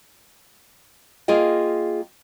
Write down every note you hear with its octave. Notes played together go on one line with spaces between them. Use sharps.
A#3 F4 G#4 D#5 G5